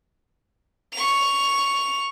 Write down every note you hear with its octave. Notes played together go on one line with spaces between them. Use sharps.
C#6 F7